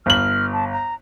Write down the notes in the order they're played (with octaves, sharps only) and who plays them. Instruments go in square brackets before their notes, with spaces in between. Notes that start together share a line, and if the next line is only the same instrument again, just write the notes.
[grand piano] G1 F#7 [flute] F6
[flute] A5
A#5